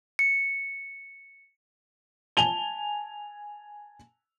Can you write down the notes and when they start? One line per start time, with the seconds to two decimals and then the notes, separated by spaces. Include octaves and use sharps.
0.19 C#7
2.37 G#5 A5 F7 G7